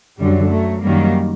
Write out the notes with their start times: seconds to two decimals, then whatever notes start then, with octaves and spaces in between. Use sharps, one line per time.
0.19 F#2 D3 F#3 G3
0.51 F#3 A3
0.84 F#2 D#3 F#3 G3 A#3